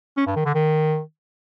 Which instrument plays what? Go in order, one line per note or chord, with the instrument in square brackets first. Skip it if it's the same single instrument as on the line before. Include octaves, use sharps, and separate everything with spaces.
[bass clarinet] C#4
G2
D#3
D3
D#3